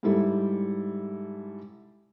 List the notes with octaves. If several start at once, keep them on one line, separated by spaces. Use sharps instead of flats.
G#2 G3 E4 A4